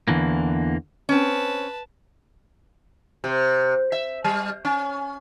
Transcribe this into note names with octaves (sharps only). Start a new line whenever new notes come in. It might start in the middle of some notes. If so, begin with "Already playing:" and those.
E2 D3 E3 A#3
C4 C#4 B4 A5
C3
E5
G3
C#4